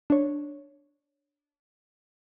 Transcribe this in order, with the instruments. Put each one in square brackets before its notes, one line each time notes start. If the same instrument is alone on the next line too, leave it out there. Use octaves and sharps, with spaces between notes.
[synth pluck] D4 C#5